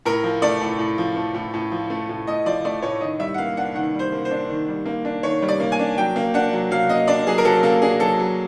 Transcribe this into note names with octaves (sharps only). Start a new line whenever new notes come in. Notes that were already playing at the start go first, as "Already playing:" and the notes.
A2 A#4
F3
A3 D5
A2
A2
F3
A3
A2
A2
F3
A3
A2
A2 D#5
F3 D5
A3 D5
A2 C#5
D#3 D#5
G3 E5
F#5
A#3 F5
D4 F#5
D#3 F#5
G3
C5
A#3
C5
D4
D#3
G3
A#3
D4
D#3 C#5
G3
D5
A#3
G#5
D4
F#3 G5
A#3
D4 F#5
F#3
F#3 F5
A#3 D#5
D4 D5
F#3 G#4
A#4
F#3 A4
A#3 A4
D4 G#4
F#3 A4
F#3